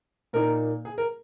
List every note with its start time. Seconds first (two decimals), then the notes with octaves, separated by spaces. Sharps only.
0.33 A#2 A#3 D#4 A#4
0.85 G#4
0.98 A#4